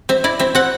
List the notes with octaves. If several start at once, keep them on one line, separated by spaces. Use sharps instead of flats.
C4 E5
E4 D5
C4 E5
C4 F#5